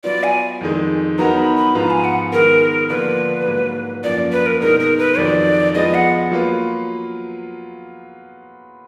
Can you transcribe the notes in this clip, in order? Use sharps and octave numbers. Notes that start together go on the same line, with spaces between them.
F#3 B3 F4 D5
G#5
F2 D#3 G#3
F#3 B3 D#4 F#4 A#4 A#5
B5
B5
G#2 F3 B3 F4 B4 A#5
G#5
F#5
D#3 G#3 B3 A#4
D3 F3 A#3 D4 F4 B4
G#2 F#3 A#3
F#2 F3 A#3 D5
B4
A#4
B2 G#3 D#4 A#4
A#4
B4
F2 D#3 F#3 D5
F3 G#3 B3 D#5
F#5
F#3 A#3 F4 B4